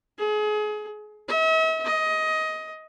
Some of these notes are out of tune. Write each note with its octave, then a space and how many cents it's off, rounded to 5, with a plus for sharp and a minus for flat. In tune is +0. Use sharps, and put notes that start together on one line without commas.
G#4 +30
E5 -45
D#5 +20